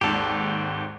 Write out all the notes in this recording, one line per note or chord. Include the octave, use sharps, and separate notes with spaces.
G#1 D#2 G#2 G4 A4